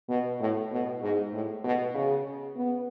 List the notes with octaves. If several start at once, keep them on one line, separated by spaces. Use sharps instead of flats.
B2
A2
B2
G#2
A2
B2
C#3
B3